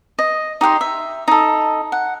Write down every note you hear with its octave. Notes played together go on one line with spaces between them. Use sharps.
D#5
D#4 G4 F#5 C6
E5
D#4 A4
F#5